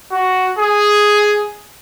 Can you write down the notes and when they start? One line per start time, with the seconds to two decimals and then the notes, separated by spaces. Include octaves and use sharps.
0.12 F#4
0.58 G#4